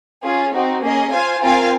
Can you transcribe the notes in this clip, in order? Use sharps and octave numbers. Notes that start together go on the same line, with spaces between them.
C#4 F4 G#4
C4 D#4 F#4
A#3 C#4 G#4 D#5
F4 C5 F5 G#5
C4 F4 A#4 F5 G#5